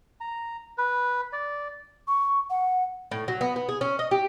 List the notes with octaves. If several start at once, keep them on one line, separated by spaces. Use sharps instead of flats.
A#5
B4
D5
C#6
F#5
A2
F#3
B3
B3
G#4
C#4
D#5
G4